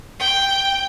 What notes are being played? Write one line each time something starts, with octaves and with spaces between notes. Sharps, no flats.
G5